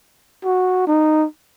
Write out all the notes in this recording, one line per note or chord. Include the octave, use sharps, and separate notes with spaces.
F#4
D#4